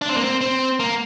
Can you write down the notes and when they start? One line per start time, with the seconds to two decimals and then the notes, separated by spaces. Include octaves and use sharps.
0.02 D4
0.09 C4
0.17 A#3
0.24 C4
0.41 C4
0.80 A#3